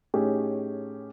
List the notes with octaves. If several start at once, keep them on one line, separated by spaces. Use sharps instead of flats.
A2 C#4 D#4 G4 G#4